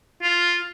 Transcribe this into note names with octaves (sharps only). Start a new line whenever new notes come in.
F4